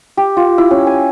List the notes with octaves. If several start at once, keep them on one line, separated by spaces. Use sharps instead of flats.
G4
F4
E4
C#4
G#5